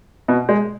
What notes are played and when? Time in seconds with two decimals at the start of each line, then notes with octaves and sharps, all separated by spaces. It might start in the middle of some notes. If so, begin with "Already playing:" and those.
0.28 B2
0.49 G#3